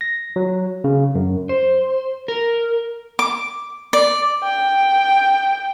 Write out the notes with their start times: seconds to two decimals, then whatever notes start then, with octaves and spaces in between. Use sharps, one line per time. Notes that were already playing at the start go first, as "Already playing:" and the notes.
0.01 A#6
0.36 F#3
0.84 C#3
1.15 F#2
1.49 C5
2.28 A#4
3.19 D6
3.93 D5
4.43 G5